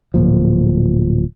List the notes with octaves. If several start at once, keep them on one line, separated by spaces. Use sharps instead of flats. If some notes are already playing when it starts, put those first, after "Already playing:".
D1 C2 A#2 F3